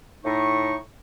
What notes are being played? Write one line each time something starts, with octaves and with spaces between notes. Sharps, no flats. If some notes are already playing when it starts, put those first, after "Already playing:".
A2 D#4 C#6